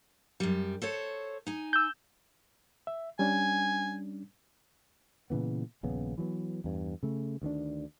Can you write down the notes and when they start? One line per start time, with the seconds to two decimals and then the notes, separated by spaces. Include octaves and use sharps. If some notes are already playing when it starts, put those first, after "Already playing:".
0.40 F#2 G3
0.82 A4 C5 C#5
1.47 D#4 G#5
1.73 E6 G6
2.87 E5
3.19 G3 C#4 D4 G#5
5.30 A#2 C#3 E3 B3
5.83 D#1 A#1 C#3 B3
6.18 E3 F#3 G#3 B3
6.64 E2 G2
7.03 C#3 A3
7.42 D2 D#3 B3 D4